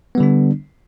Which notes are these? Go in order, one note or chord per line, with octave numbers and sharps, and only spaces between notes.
D3 G3 B3 D4